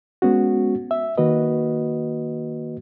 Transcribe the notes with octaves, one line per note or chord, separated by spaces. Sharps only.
G#3 B3 C#4 F#4
E5
D#3 A#3 F#4 B4 D#5